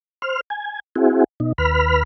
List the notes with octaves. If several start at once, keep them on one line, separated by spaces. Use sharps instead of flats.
C5 F6
G#5
C4 E4 F#4 G#4
B2 D#4
D#2 B4 B5 F6